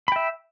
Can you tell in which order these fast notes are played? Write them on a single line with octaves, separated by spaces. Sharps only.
B5 G5 E5